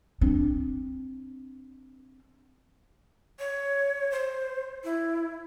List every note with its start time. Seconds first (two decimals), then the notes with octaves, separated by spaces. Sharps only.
0.21 C4 D4
3.40 C#5
4.12 C5
4.84 E4